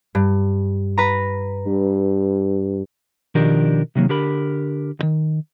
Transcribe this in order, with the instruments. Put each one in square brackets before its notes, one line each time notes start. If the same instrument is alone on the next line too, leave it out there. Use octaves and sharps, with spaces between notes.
[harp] G2
B4 A#5
[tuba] G2
[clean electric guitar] B2 D#3 F3 D4 G4 A#4
C3 D#3 F#3 A#3
D3 G4 A#4 B5
C#2 D#3